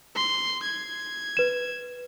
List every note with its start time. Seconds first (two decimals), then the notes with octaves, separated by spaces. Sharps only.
0.16 C6
0.63 G#6
1.37 B4 E7